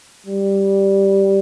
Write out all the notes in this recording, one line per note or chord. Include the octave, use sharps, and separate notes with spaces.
G3